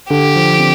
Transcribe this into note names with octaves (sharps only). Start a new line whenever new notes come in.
D3 G4
F3
C4